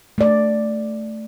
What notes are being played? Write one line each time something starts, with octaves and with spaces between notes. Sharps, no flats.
A3 D5